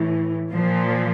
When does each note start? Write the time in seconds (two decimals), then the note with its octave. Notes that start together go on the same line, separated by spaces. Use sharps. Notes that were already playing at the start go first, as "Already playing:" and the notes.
Already playing: A2 E3
0.50 A#2 F3